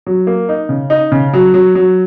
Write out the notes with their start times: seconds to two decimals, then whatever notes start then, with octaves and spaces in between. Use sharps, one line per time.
0.07 F#3
0.27 A#3
0.49 D#4
0.69 C#3
0.90 D#4
1.12 C#3
1.33 F#3
1.54 F#3
1.75 F#3